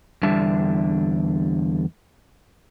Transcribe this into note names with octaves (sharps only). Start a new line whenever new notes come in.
E2 D3 G3 D4 E5 A5